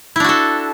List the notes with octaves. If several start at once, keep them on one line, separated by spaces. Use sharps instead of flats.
D4 E4 F#4 A4